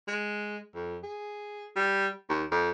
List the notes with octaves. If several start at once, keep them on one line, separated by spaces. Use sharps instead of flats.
G#3
F2
G#4
G3
D#2
F2